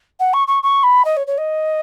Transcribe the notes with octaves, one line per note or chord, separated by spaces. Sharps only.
F#5
C#6
C#6
C#6
B5
D#5
C#5
C#5
D#5